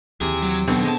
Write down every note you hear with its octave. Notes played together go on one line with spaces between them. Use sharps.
D#2 C3 E3 G#4
F#3
F#2 B2 D3 D#3 C4
D#2 G#3 A5